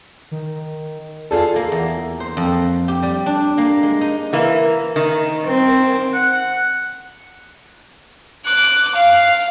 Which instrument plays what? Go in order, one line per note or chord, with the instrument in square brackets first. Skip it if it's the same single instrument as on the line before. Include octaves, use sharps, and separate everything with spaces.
[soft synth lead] D#3
[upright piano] F4 G#4 A4 [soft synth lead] D5
[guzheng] A#3
E2
C5
F2
G4
G3
D4
A#3
G#3
D#4
[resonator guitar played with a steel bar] E3 A#3
D#3
[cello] C4
[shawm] F#5
[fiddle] D6 F#6
F5